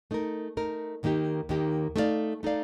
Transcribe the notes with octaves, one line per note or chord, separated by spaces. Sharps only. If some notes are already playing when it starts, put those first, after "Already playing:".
A3 D#4 A#4
A3 D#4 A#4
D#2 D#3 A#3 D#4 G4
D#2 D#3 A#3 D#4 G4
A3 D#4 A4 D5 F5
A3 D#4 A4 D5 F5